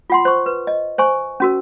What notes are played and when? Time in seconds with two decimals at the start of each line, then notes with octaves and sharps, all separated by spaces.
0.10 F4 F#5 C6
0.25 C5 C#6
0.46 B4
0.67 D#5
0.98 C5 G#5 C#6
1.40 C#4 F#4 A#4